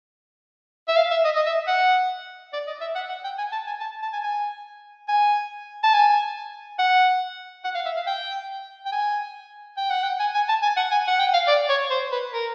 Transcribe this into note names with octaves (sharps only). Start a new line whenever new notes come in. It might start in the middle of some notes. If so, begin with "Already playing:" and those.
E5
F5
E5
D#5
D#5
E5
F#5
D5
D#5
E5
F#5
F#5
G5
G#5
A5
G#5
A5
A5
G#5
G#5
G#5
A5
G#5
F#5
F#5
F5
E5
F5
G5
G5
G#5
G5
F#5
G5
G#5
G#5
A5
G#5
F#5
G#5
F#5
G5
F5
D5
C#5
C5
B4
A#4